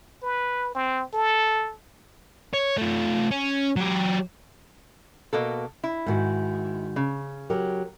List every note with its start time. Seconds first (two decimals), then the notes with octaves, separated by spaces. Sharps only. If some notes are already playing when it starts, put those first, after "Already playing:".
0.22 B4
0.75 C4
1.13 A4
2.53 C#5
2.78 A3 F4
3.31 C#4
3.76 F#3 G4
5.33 B2 A#3 A4
5.84 E4
6.06 G#2 D#3 F#4
6.96 C#3
7.50 F#3 G4 A#4